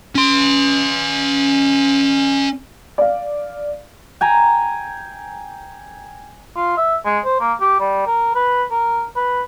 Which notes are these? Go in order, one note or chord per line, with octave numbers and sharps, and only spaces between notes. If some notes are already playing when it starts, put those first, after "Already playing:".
C#4 C6
D5 F5
G5 G#5 A#5
F4
E5
G#3
C5
A#3
G4
G3
A#4
B4
A#4
B4